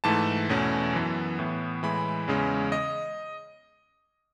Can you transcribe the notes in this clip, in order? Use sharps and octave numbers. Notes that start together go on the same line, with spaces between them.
G#2 E3 A3 A5
E2 B2 A3 C#4
F#2 E3 B3
A2 E3 B3
A2 E3 G#3 B5
E2 C#3 G#3 C#4
D#5